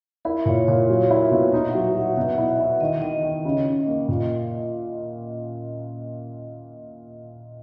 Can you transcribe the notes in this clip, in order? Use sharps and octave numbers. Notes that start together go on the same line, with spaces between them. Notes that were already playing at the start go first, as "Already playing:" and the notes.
E4 A#4
A#2 C#5
A#2 C#5
F#3
E4
B2
D#4 E5
F#5
F#3
E5
F#3
F#5
B2 E5
E4
E5
E4
D#3 D#5
D#3 D#5
D#3
C#3
C#3
A#3
A#2